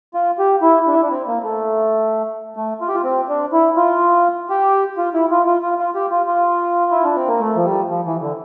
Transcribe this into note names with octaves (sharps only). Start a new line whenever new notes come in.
F4
G4
E4
D4
E4
D4
C4
A#3
A3
A3
F4
G4
F4
C4
D4
E4
F4
G4
F4
E4
F4
F4
F4
F4
G4
F4
F4
E4
D4
C4
A#3
A3
F3
G3
F3
E3
D3